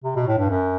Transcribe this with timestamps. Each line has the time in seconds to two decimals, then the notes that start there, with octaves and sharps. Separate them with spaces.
0.04 C3
0.16 B2
0.27 A2
0.38 G2
0.50 F#2